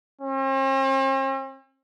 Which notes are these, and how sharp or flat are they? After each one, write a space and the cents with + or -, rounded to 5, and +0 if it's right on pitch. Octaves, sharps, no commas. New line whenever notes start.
C4 +45